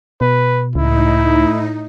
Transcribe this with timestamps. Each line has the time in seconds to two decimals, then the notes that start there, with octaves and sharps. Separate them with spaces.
0.21 B2 B4
0.75 C#2 A2 D#4 E4